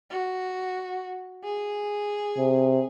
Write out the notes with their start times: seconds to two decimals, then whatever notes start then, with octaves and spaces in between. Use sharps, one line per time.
0.11 F#4
1.44 G#4
2.38 C3